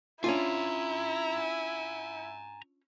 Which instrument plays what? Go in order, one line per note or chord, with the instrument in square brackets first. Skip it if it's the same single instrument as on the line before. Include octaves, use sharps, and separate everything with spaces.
[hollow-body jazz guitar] C#4 D4 F4 [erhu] E4 [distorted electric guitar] G#5 A#5